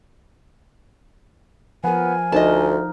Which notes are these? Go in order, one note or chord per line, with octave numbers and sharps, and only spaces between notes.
F3 B3 A#4 G#5
D2 F3 D#4 A#4 D#5 A5